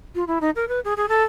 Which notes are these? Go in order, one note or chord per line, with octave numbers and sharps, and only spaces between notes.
F4
E4
D#4
A#4
B4
G#4
G#4
A4